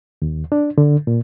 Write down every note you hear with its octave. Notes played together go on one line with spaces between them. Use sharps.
D#2
D4
D3
A#2